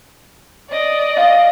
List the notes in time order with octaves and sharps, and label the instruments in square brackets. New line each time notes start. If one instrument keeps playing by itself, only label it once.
[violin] D5 D#5
[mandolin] F4